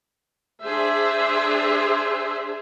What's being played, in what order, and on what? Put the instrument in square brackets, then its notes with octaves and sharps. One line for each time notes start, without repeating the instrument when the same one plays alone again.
[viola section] D4 G#4 C5 E5